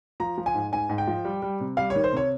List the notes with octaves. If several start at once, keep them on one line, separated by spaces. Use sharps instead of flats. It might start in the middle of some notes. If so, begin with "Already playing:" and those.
F3 A#5
F3
G#5
G#2
G#2 G#5
G#2
G5
F3
G3
G3
C3
G3 F5
C#5
D#3
C5
C3 C#5